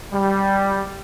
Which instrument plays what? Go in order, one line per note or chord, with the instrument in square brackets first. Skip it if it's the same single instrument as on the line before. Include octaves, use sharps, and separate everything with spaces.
[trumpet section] G3